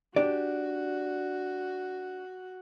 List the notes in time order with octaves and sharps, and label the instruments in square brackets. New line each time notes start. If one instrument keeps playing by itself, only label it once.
[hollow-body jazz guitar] D4 G4 D5 [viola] F#4